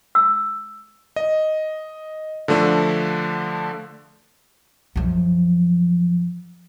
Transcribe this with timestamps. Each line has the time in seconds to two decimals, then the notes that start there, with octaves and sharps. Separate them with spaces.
0.15 E6
1.16 D#5
2.48 D3 F3 A3 D4
4.96 F#2 F3